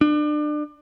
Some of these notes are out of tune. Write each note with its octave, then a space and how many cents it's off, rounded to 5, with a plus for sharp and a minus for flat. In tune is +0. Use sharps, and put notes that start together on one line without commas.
D4 +30